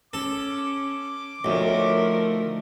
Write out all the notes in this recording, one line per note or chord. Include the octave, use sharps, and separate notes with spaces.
C#4 A4 D6
D2 D#3 F3 A3 A#4 C#5 E5